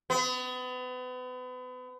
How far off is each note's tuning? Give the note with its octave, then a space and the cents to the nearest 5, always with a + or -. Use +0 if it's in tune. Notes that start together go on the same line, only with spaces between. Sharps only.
B3 +35